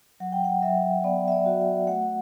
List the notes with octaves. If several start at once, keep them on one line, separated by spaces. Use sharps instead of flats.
F#3 F#5
G5
F#5
F#3 E5
B3 D5
E5
D5
F#4
A3 F#5